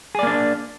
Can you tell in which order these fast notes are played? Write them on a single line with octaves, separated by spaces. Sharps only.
G#4 D5 A#3 D4